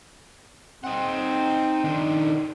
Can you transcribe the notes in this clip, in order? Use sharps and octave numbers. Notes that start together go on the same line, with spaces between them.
C4 D#4 F#5
D#3 D4